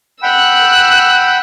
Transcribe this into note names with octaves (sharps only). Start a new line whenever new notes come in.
F#5 G5 B5 E6 F#6